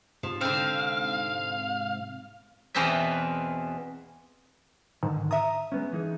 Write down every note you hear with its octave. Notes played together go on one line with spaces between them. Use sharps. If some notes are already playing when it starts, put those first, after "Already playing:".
G#2 C3 F3
D3 C4 F5
E2 B2 E3 C4 F4 E5
G#2 D3 D#3
E5 A#5 D#6
G#3 B3 C#4
E3 D#4 G#4